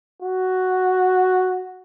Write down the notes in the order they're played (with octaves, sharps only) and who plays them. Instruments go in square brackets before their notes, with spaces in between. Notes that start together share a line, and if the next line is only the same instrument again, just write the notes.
[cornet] F#4